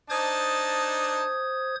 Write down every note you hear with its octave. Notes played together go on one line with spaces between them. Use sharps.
D4 D#4 C5 A5 D#6 G#6